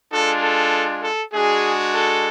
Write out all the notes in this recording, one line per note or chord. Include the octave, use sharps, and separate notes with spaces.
G#3 D4 F4 A4
A4
A4
G#3 D4 F#4 G#4
A4